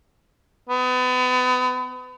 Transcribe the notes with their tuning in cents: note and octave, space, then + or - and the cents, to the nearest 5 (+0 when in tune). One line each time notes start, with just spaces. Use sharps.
B3 +35